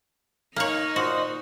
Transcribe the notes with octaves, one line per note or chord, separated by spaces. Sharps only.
A#3 D#4 C#5
A#2 F#4 C5 D#5